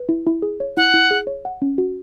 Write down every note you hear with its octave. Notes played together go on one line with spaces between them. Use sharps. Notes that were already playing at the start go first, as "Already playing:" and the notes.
Already playing: B4
E4
E4
G#4
C#5
E4 F#5
E4
G#4
C#5
F#5
C#4
F#4